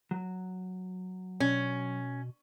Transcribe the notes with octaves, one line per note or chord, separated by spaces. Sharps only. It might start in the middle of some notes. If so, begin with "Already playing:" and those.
F#3
B2 C#4